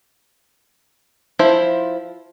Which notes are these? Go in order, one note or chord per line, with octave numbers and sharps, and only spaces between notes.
F3 E4 C5